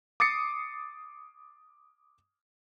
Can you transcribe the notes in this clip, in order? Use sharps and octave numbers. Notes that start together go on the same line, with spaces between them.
D6 D#6 A6 C7 C#7